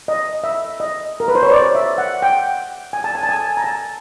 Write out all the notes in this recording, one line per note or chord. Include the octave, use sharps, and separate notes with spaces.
D#5
E5
D#5
A#4
B4
C5
C#5
D5
E5
F#5
G5
G#5
A5
G#5
A5
G#5
A#5
A5